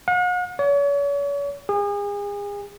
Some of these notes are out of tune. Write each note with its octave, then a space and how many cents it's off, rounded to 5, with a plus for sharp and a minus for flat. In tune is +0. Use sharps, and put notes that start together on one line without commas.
F#5 -45
C#5 +40
G#4 -35